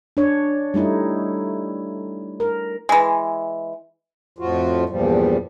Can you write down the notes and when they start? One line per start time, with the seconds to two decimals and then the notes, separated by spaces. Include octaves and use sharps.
0.17 D4 C#5
0.74 G3 A3 D#4 E4
2.40 A#4
2.89 E3 G#3
4.39 F2 A2 F3 F4 F#4
4.89 E2 G2 A#2 F3 G3